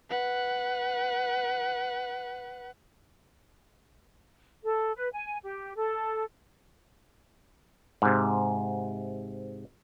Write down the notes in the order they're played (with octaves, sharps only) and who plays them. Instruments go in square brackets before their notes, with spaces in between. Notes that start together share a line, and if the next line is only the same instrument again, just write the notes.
[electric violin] B4 F#5
[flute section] A4
B4
G#5
G4
A4
[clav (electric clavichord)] G#2 C3